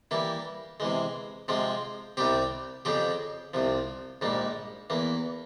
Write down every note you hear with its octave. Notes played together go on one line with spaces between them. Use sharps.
E3 G3 A#3 E4
C3 E3 G#3
C3 F3 G#3 C4
C2 C3 G3 C4 G4
F2 C#3 F3 C4 G4
C2 C3 F3
A#1 G#2 G3 A#3
E2 E3 A#3